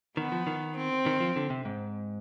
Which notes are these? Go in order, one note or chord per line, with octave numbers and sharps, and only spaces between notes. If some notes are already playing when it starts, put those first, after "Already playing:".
D#3 B3
F3
D#3
C4
D#3
F3
D3
C3
G#2